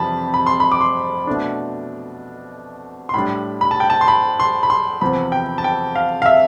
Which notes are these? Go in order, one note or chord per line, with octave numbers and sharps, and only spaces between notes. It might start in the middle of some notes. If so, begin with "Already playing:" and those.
Already playing: F2 C3 E3 G3 A5 B5
B5
C6
B5
D6
C6
B2 A3 D4
C6
A2 G3 D4 B5
B5
A5
G5
A5
C6
B5
C6
B5
C6
E2 C3 F3 C4 B5
G5
A5
G5
F5
F5
E5